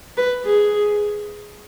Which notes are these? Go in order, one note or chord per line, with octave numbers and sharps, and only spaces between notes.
B4
G#4